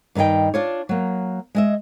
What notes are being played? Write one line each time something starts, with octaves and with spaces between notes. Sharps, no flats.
G2 D#3 F#4 D#5 G5
D4 F4 C#5
F#3 A#3
G#3 D#5 E5